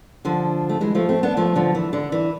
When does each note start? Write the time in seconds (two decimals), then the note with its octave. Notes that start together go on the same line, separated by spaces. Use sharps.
0.25 D3 F3
0.69 A3
0.81 E3 G#3
0.95 F3 A3
1.09 A3 C4
1.23 B3 D4
1.37 F3 A3
1.56 D3 F3
1.75 E3
1.93 D3
2.12 E3